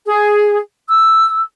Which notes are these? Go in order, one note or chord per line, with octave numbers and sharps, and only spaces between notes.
G#4
E6